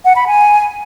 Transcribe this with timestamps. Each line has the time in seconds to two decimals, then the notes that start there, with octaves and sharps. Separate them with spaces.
0.05 F#5
0.16 B5
0.27 G#5